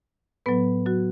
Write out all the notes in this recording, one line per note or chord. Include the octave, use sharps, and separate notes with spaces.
A2 F#3 B3 B4
F#3 F#4